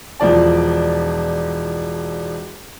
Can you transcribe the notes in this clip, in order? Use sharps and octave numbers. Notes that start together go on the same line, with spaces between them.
E1 F3 D5 A5